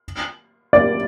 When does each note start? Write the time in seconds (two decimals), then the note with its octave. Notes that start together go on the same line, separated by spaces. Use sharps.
0.73 D5